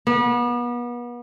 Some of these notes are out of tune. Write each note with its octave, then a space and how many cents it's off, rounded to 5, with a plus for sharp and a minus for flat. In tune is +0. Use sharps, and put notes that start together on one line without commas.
B3 -35